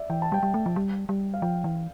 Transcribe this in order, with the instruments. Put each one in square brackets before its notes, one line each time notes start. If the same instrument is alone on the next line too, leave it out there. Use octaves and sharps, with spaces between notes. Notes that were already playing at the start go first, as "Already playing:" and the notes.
Already playing: [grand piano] D5 E5
[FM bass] E3 [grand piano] G5
[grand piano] A5
[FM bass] G3 [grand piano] G5
[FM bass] G3
A3
F3
G3
G3
[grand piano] F5
[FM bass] F3 [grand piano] G5
[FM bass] E3